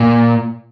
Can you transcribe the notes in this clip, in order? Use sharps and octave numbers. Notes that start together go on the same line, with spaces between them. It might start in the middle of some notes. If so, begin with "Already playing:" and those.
Already playing: A#2